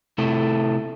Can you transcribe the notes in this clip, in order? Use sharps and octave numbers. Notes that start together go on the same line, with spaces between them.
C3 A3 E4 A4